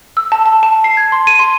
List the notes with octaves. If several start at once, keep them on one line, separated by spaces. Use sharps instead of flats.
E6
A5
A5
A5
C7
G#6
C6
D#7
C6